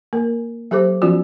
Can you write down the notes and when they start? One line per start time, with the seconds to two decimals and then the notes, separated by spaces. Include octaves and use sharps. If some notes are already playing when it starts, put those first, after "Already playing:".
0.13 A#3 A#4
0.71 F#3 G4 A4 C5 D6
1.02 F3 B3 C#4 F4 F#4